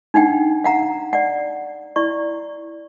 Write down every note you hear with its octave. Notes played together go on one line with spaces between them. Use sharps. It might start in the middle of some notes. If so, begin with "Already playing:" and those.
D4 D#4 F#5 G5
F5 F#5 A#5
D5 F#5
E4 D5 C#6